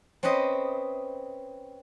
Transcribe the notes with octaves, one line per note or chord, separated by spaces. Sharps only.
C4 C#4 B4 C5 D#5